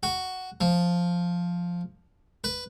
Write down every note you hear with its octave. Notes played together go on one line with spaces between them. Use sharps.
F#4
F3
B4